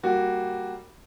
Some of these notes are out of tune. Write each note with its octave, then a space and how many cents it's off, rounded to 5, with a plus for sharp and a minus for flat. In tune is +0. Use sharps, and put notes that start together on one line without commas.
G3 +0 A#3 -15 F#4 +0